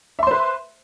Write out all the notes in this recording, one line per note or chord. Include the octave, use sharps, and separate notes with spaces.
B4 C5 E5 C6